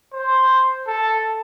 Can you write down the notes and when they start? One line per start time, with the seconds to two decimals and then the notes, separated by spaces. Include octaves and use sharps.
0.14 C5
0.87 A4